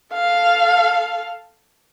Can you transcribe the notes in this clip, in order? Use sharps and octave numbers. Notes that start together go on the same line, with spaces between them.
A4 F5